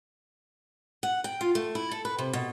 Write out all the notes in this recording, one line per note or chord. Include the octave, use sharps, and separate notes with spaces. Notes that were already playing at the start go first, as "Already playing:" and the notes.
F#5
G5
F4
A3
E4
A4
B4
C3
B2